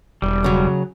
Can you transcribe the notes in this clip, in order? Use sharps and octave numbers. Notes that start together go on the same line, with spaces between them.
E1 G3
C#3 F#3